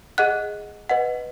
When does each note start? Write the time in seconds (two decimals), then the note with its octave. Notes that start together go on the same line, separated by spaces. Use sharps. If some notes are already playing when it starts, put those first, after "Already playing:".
0.18 G#4 D#5 F#5 F#6
0.89 B4 D#5 F#5